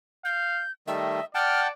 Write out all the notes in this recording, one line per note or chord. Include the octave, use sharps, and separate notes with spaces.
F5 G6
D#3 G3 A3 D#5 E5
D5 F#5 G5 A5 F6